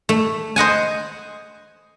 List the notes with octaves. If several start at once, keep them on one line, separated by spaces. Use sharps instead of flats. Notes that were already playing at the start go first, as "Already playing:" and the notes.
A3
C5 D#5 F#5 G#5